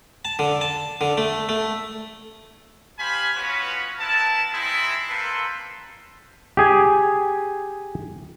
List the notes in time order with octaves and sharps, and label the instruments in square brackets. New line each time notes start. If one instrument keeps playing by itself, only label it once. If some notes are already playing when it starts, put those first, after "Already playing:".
[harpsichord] A5
D3
A5
D3
A3
A3
[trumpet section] G4 C5 F5 G#5 B5
B3 C#4 F4 F#4 B4 C#5
B3 E4 A#4 A5
G#3 C4 D#4 E4
A#3 C4 A4 B4 C6
[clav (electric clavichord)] G4 G#4 G#5